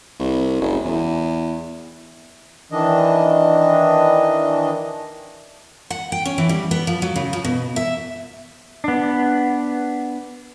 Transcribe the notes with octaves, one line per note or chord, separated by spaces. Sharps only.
C2
F#1
E2
D#3 E3 D4 D#5
F#5
G5
C#4
E3
G3
B3
F3
F#3
C#3
F3
B2
E5
B3 D4